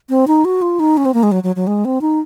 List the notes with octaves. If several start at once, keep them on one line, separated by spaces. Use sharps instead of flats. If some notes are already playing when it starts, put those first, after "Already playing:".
C4
D#4
F#4
F4
D#4
C#4
C4
A#3
G#3
F#3
F#3
F#3
G#3
C4
D#4